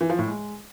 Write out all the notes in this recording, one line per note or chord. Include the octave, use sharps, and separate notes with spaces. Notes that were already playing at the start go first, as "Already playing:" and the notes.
E3
F3
A2
G#3